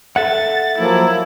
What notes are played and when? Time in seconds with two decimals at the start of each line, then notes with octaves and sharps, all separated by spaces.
0.16 A4 E5 F#5 A6
0.78 F3 F#3 A#3 E4